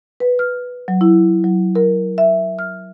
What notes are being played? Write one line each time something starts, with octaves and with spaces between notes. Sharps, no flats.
B4
F6
F#3
E4
F#3
A#4
E5
F6